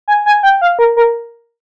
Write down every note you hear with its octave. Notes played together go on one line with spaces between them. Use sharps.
G#5
G#5
G5
F5
A#4
A#4